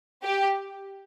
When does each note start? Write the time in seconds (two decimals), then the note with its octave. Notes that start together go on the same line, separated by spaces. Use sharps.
0.24 G4